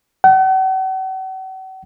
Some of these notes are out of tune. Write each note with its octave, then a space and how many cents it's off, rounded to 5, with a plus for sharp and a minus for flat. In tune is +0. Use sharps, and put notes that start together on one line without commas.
F#5 +45